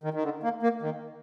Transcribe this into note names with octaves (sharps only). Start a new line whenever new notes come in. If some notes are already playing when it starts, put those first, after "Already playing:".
D#3
D#3
D3
A#3
A#3
D#3